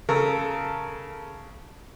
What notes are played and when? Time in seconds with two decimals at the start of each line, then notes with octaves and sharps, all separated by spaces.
0.09 C#3 A4 A#4